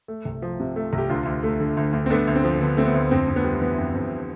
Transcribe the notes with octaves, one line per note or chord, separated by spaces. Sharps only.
A3
C2
F3
C3
A3
C2
G4
D2 D4 F4
D2
A3
D3
D2
D2
C4
A3 B3 D4
D2
C4
F3
D3 B3
A3 C4
B3
D2
F2 C4
F2
B3 D4
G3
E3 B3
F2
F2